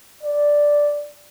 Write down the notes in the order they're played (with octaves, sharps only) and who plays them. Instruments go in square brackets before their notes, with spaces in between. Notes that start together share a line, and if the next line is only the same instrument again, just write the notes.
[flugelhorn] D5